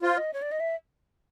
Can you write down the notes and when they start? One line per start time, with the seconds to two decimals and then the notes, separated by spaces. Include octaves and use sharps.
0.02 F4 C5
0.17 D#5
0.33 C#5
0.42 D5
0.51 D#5
0.60 E5